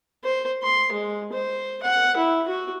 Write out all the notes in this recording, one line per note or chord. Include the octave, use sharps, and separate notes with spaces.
C5
C6
G#3
C5
F#5
E4
F#4